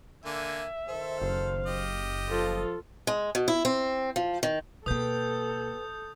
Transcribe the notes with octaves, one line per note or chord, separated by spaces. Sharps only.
D3 A#3 E5 G#5
D#3 A4 C5
F#1 F5
G4 D#5
F3 F4 A4
G#3
B2
E4
C4
F3
D#3
B2 A#3 A4 B4 G5 D#6 G6